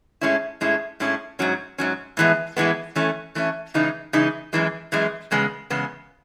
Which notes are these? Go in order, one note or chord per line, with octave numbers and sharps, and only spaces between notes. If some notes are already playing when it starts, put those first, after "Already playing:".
A2 G#3 C#4 E4
A2 G#3 C#4 E4
A2 G#3 C#4 E4
G#2 F#3 C#4
G#2 F#3 C#4
A2 E3 G#3 B3
A2 E3 G#3 B3
E3 A3 C#4
E3 A3 C#4
C#3 E3 G#3 D#4
C#3 E3 G#3 D#4
F#2 E3 G#3
F#2 E3 G#3
E2 C#3 G#3 B3
E2 C#3 G#3 B3